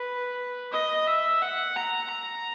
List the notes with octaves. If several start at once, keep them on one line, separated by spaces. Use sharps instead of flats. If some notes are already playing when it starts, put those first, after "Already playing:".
Already playing: B4
D#5
E5
F#5
A#5
A#5